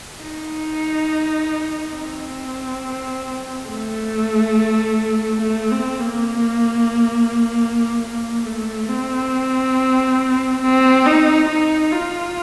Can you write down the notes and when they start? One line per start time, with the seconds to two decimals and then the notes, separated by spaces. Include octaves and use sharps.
0.22 D#4
1.95 C4
3.68 A3
5.41 A3
5.71 C4
6.00 A#3
8.02 A#3
8.45 A3
8.89 C4
10.62 C4
11.06 D#4
11.49 D#4
11.92 F4